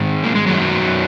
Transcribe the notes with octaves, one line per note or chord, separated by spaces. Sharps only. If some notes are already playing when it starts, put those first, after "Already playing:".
Already playing: G#2 D#3 G#3
A#3
G#3
F#2 D#3 F#3